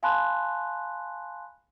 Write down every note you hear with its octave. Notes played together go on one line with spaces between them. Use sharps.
F5 G#5 A5 B5 C6 F#6